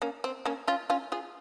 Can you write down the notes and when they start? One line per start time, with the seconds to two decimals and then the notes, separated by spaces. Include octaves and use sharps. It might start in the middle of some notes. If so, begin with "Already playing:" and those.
0.02 A#3 C#4
0.24 C4
0.45 A#3 C#4
0.67 C#4 F4
0.90 C#4 F4
1.12 F4 G#4